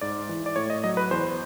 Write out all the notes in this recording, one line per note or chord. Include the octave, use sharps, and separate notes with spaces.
G#2 D5
E3
D5
A2 C#5
D#5
F#3 D#5
B4
E2 C5